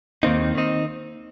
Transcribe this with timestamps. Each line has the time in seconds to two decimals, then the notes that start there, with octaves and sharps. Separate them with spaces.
0.23 D#2 D#3 A#3 C4 D#4
0.55 D#3 C4 D#4